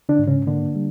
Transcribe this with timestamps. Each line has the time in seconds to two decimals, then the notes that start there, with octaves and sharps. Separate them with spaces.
0.09 D3 D4
0.19 G#2
0.28 C#3 C#4
0.47 D3 A#3 D4
0.75 G3